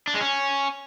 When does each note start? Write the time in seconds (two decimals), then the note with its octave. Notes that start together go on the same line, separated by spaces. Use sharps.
0.07 D4
0.14 G#3
0.21 C#4